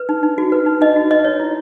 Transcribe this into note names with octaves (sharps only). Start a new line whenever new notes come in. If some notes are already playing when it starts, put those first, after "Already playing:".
Already playing: B4
D#4
D#4
F#4
B4
D#4
D#4 D#5
F#4
B4 D#5
D#4 C#5
E4